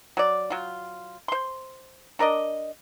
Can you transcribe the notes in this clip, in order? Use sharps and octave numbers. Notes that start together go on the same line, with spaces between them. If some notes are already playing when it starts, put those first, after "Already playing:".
F#3 D5
F#3 F4
C5 C6
D4 A#4 D5 D#5